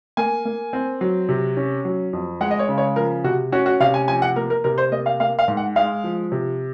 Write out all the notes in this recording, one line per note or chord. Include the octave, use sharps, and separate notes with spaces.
A#3 G#5
A#3
C4
F#3
C3
C#4
F#3
F2
G#3 F#5
D#5
C#5
C#3
C#5
F3 A#4
C3 F#4
C#4 F#4
F#4
C3 F5
G#5
F3 G#5
F#5
A#3 A#4
A#4
C3 A#4
C5
A#3 D#5
F5
A#3 F5
F5
G#2
F#5
G#3 F5
F3
C3